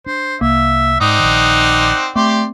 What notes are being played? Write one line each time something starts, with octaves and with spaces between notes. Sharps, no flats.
D4 C5
C2 A#3 E5
G#2 C4 D#4 D5 F#5 D#6
A#1 D#3
A3 C4 G4 D5 C6